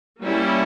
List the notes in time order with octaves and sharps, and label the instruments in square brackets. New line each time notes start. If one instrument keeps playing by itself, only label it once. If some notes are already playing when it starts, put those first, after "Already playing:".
[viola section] G3 A#3 C#4 E4